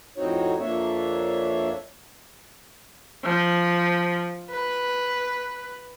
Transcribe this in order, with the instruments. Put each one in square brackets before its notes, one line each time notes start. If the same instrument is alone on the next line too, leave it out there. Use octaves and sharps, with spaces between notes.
[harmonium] F2 A2 C4 D#4 F#4 C#5
F2 A#3 D4 C#5 E5
[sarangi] F3
B4